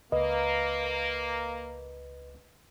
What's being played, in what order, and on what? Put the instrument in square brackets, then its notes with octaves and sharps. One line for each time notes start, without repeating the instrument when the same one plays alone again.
[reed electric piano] C#2 D#5 [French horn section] A#3 [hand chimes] B4